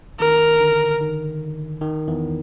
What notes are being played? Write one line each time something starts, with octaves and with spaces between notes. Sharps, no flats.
D#3 A#4
D3
D#3
D#3
E2 E3